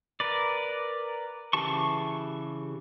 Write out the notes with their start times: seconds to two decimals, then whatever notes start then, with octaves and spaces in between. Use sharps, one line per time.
0.20 A#4 B4 D5
1.53 C#3 E3 G4 A5 C#6